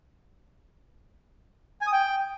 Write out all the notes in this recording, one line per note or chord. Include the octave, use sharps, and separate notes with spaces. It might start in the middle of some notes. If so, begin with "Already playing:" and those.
G#5
D#6
G5